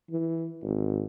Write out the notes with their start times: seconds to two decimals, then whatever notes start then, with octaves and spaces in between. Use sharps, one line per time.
0.11 E3
0.63 G#1